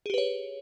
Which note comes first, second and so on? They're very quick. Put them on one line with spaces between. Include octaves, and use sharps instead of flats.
G#4 G4 B4 C#5